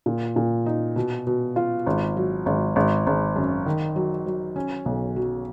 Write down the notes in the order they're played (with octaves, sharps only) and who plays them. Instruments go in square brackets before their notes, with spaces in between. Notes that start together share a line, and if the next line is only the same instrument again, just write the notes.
[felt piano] A#2
A#2
D#4
B2
B2
F4
G#1
F#3
G#1
G#1
G#1
F#2
D#3
F#3
F#3
C#4
B1
F#3